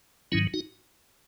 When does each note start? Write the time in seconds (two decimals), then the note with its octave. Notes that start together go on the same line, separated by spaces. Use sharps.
0.32 G#2 D#3 F#3 C#4 E4
0.54 D#4 F#4